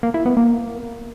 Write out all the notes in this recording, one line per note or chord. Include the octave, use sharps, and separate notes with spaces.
A#3
E4
B3
A#3